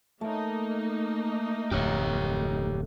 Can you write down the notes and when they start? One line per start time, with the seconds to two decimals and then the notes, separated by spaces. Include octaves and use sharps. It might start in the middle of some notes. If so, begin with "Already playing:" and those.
0.21 A3 A#3 D#4
1.71 D1 F2 G4 C#5